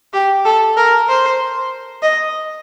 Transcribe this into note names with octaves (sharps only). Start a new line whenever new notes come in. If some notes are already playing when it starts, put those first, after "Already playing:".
G4
A4
A#4
C5
D#5